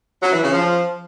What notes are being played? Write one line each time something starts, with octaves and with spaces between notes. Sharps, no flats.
F#3
E3
C#3
F3